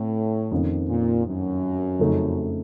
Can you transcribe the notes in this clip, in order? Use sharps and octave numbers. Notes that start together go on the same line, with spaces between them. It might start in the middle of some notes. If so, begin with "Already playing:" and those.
Already playing: A2 C4
F2 D#3 A#3 C#4
A#2
F#2
F2 C#3 A3 D#4